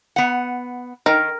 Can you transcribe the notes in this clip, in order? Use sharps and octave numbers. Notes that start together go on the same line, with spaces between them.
B3 F#5
D#3 A#4